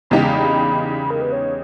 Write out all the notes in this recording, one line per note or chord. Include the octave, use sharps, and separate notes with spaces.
E2 C#3 G#3 D#4 G4 B5
A#4
B4
C#5